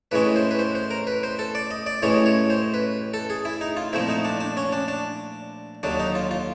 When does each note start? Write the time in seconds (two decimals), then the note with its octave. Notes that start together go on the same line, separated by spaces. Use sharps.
0.11 A2 E3 G#3 C#4 B4
0.36 C5
0.51 B4
0.59 C5
0.75 C5
0.91 A#4
1.07 B4
1.23 C5
1.39 A4
1.55 D5
1.71 D#5
1.86 D5
2.02 A1 A2 E3 G#3 C#4 C#5
2.26 C#5
2.50 C5
2.74 B4
3.14 A4
3.30 G#4
3.45 E4
3.61 D#4
3.77 F4
3.93 A#2 F3 A3 C4 E4
4.09 D#4
4.25 D4
4.40 D4
4.57 C#4
4.72 D4
4.88 D4
5.83 D#2 D3 F#3 D4
6.00 D#4
6.15 F4
6.31 F4